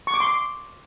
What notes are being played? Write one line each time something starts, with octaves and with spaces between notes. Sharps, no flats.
C#6
D6
C6
D6